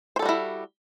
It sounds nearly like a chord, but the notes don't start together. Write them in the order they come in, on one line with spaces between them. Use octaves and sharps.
C5 A4 G3 F#4 E4